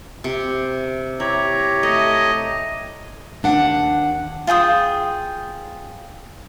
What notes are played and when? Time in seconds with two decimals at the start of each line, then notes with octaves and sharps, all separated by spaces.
0.24 C3
1.20 E4 G4 C#5 A#5
1.83 A3 D#5
3.43 D#2 D4 F#5
4.47 F4 G#4 G5 D#6